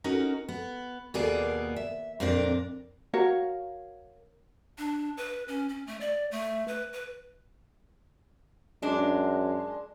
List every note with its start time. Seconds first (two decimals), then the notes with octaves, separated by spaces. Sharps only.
0.04 C#4 D#4 F#4 A#4
0.48 B3
1.14 D#2 B2 A#3 B3 G#4 D5
1.76 E5
2.20 F2 A#2 C4 D4 A#4 D5
3.14 F#4 A#4 C#5 F5
4.78 D4
5.17 B4
5.48 C#4
5.69 C#4
5.87 A3
6.01 D5
6.31 A3
6.68 B4
6.93 B4
8.82 F#2 G#3 D4